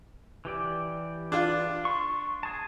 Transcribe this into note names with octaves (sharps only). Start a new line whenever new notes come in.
E3 G4 D5
D4 F4
C6 C#6
G#4 A5